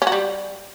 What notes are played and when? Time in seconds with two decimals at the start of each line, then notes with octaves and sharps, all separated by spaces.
0.02 C#4
0.07 F#4
0.12 G3